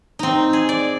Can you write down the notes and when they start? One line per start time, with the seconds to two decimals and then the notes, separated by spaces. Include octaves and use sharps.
0.19 C4 D#4
0.53 G#4
0.69 D5